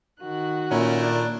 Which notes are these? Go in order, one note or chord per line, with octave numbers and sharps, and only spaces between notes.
D#3 F#4 F#6
A#2 A3 C#4 E4 A#4
D4